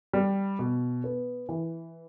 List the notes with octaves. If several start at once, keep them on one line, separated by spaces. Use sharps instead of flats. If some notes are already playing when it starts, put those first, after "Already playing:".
G3
B2
B3
E3